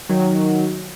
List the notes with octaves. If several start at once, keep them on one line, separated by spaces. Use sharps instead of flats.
D#3 F#3